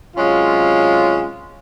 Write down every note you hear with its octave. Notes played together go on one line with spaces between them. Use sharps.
C3 F#3 G#3 C#4 F4